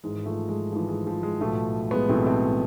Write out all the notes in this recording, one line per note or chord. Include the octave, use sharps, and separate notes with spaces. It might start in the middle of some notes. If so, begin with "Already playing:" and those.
G#1 G#2 E3 G#3
F3 A3
G#3
G#1 G#2 E3 F3
G#3
F3
G#3
B1 A2 E3 F3 A3
G#3 B3
B1 A2 E3 A3 C4
A3 C4